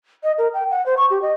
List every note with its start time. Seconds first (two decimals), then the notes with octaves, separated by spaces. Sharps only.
0.23 D#5
0.38 A#4
0.54 G5
0.70 F#5
0.86 C5
0.97 C#6
1.10 G4
1.22 D#5